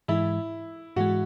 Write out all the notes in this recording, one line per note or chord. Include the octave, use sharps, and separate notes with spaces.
G#2 E3 G#3 E4
G#2 E3 G#3 F#4